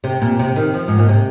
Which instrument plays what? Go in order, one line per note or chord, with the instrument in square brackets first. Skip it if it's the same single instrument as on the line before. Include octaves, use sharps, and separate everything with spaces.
[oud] C3
A#2
C3
D#3
F3
G#2
A#2
C3